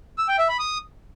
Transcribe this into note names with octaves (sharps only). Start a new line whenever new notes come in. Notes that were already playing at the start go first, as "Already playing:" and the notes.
E6
G5
E5
B5
D#6